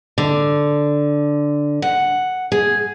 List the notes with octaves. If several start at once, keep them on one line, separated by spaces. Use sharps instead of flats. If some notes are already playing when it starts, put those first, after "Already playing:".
D3
F#5
G#4